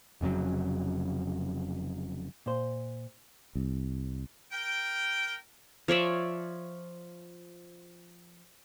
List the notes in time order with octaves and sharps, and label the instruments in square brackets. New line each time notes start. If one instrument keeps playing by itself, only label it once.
[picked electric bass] F1 F2 C#3 F#3
[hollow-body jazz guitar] A#2 C5
[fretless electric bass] C2
[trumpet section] A#4 G5
[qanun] F3 C#5 D5 E5